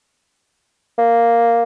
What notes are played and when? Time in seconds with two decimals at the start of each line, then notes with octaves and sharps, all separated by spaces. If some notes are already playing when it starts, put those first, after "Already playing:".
0.98 A#3